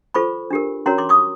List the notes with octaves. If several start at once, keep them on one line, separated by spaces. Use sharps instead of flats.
F4 A4 C5 B5 C#6
D4 G4 A#4
C#4 F#4 A#4 C#5 A#5 C6
C6 D6
C#6 D#6